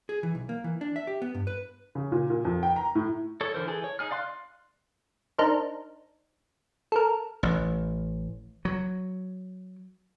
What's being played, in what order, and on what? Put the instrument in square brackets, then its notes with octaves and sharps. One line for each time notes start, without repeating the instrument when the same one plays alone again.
[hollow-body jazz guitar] G#4
E3
B1
A#3
E3
D4
E5
G4
B3
G2
B4
[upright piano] C#3
A#2
A#2
F2
G5
A#5
A2
[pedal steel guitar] A4 C#5
D3 E3 A#4 C5
E3 G#4 A4
C#5
D#4 G#4 F6
D5 F5 C6 F6 F#6
[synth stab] D4 D#4 A#4 C5
A4 A#4
[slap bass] A1
F#3